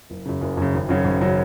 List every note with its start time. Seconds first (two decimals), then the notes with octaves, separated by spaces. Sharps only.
0.10 F#1
0.26 F#2 C#3
0.41 F#1
0.57 F#2 C#3
0.74 G#1
0.89 F#2 C#3 F#3 C#4
1.05 G#1
1.21 C#3 F#3 C#4